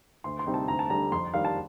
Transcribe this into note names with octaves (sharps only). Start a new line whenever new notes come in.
D2 C6
C6
C3 G3 C4 D#4
A5
D2 A#5
A5
D3 G3 A#5
F2 C6
D#3 G3 D4 F5
A5